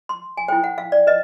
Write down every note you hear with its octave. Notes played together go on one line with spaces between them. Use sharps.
C6
G#5
E4 A4 C5 G5
F#5
F5
D5
B4 D#5